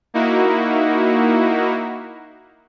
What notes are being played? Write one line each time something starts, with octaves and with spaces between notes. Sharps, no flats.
A#3 D#4 E4 F#4